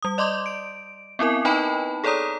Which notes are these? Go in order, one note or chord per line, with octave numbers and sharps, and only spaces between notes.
G3 D#6
D5 D#5 C6 D6 G6
D7
B3 C4 E4 A#4 G#5
D#4 B4 D#5 G5 A5 B5
G#4 A4 C#5 D5 A#5 D#6